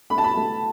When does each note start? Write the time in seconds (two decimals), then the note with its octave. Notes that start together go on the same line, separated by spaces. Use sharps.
0.10 A3 B5
0.18 A5
0.24 B5
0.37 A3